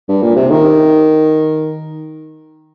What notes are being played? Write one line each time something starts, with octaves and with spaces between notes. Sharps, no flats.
G2
A#2
C3
D#3